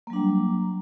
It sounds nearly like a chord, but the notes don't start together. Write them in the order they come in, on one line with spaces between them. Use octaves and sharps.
A#3 F#3 D4 G3